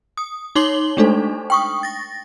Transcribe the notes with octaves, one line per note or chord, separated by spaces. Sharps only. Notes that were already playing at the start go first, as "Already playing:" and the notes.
D#6
D#4 C#5 C6 D6 F#7 G7
G#3 A3 D4 D#4 A4 C5
G5 C#6 D#6
A6 A#6